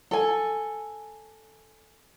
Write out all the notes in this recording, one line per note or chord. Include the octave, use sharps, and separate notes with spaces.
A4 G#5